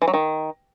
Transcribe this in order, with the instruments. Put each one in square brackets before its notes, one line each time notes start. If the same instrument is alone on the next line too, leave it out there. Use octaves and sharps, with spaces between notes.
[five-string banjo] E3
F#3
D#3